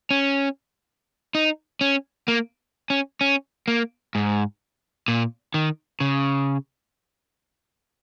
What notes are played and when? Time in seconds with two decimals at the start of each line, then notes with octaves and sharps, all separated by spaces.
0.11 C#4
1.35 D#4
1.81 C#4
2.28 A#3
2.90 C#4
3.21 C#4
3.68 A#3
4.15 G#2
5.08 A#2
5.54 D#3
6.00 C#3